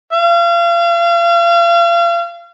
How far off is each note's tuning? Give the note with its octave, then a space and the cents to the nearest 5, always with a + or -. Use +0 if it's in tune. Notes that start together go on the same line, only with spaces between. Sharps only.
F5 -35